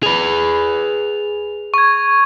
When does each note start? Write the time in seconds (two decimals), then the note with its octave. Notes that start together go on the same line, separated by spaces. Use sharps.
0.03 G#4 B4 F7
1.74 C#6 G#6